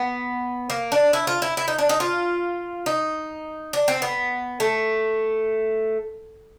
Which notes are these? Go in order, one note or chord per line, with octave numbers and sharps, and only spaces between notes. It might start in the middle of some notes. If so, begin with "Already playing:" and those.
Already playing: B3
A#3
D4
E4
F4
E4
E4
D#4
D4
D#4
F4
D#4
D4
C4
B3
A3